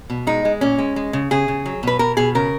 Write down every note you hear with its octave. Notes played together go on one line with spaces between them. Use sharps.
B2
G#3 D#4
G#3
A#2 C#4
G#3
G#3
C#3
C#3 G#4
C#3
F#3
B2 B4
B2 A#4
B2 G#4
C#3 A#4